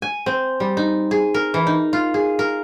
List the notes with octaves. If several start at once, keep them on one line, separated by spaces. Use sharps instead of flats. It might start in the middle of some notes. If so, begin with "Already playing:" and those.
G#5
C4
G3
D#4
G#4
A#4
E3
D#4
F4
G#4
A#4